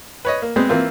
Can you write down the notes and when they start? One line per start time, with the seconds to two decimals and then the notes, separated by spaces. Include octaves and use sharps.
0.25 B4 C#5 D#5
0.42 A#3
0.56 G#3 B3 C4
0.69 E3 A#3 C4 F4